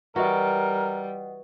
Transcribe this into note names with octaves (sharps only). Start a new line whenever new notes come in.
E3 G3 F#4 A#4 D#5 F#5